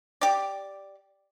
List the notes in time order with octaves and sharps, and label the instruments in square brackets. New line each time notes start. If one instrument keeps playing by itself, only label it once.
[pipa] G4 D5